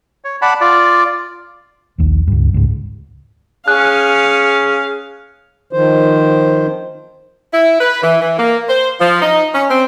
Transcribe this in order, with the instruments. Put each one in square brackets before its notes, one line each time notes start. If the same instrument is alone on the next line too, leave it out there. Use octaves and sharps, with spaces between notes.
[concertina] C#5
D5 F#5 A5 B5
F4 D5
[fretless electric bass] A#1 D#2
C#2 G2
C#2 G#2
[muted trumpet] C#4 [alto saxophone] G#4 [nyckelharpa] F5 [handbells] F#6
[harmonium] D#3 F3 C5
[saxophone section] E4
B4
E3
E3
A#3
C5
F3
D#4
C#4
C4